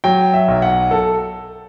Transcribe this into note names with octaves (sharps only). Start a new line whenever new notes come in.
F#3 G5
E5
B1
F#5
A4